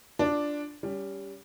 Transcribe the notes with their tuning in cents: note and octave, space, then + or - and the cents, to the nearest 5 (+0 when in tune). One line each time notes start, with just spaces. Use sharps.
D4 +0 F4 +0
G3 +10 C#4 +35